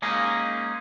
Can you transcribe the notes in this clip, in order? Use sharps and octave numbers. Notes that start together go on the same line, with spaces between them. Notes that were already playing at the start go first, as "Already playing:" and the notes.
G#3 A#3 C#4 D#4 G#4